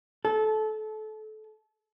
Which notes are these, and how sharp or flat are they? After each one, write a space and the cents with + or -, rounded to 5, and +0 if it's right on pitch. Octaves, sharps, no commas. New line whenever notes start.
A4 -25